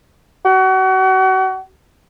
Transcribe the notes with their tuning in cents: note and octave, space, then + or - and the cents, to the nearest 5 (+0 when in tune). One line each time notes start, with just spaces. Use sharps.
F#4 +35